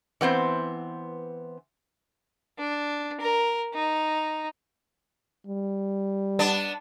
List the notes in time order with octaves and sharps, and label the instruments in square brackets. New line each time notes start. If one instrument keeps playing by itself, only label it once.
[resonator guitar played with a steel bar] E3 B3 C4 C5
[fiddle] D4
A#4
D#4
[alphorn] G3
[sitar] B3 D4